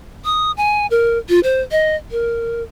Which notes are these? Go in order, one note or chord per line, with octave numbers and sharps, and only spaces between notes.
D#6
G#5
A#4
F4
C5
D#5
A#4